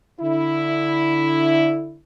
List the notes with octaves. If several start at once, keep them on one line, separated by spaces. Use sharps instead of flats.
D3 E4